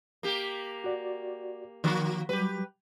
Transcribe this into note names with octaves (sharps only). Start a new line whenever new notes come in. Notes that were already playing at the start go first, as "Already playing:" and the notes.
A#3 G4
F#4 D5
D#3 F3 A#3 F#4
F#3 G3 G4 B4